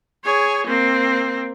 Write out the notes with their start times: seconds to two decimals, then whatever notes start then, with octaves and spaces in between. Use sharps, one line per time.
0.24 G#4 C#5
0.67 A#3 C4